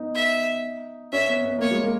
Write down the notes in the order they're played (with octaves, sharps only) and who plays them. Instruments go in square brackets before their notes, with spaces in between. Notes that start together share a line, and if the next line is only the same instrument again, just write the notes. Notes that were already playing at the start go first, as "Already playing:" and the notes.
Already playing: [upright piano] B3 D#4
[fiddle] E5
[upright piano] C#4 [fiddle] E5
[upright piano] B3
B3
[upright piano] A#3 [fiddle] C#5
[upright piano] G#3
A#3